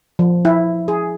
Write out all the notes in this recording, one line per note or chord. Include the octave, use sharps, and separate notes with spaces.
F3
E4
G#4